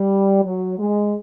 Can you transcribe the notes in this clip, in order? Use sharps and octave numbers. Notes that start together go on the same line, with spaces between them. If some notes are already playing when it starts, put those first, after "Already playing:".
Already playing: G3
F#3
G#3